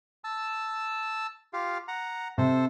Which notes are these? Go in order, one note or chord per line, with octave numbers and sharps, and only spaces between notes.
A5 E6
F4 G4 F5
F#5 A#5
C3 A4 C5